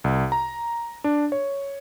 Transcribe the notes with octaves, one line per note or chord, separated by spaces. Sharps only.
C2
A#5
D4
C#5